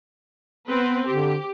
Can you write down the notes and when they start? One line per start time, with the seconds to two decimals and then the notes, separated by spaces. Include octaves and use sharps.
0.67 B3 C4 B4
1.07 D3 G4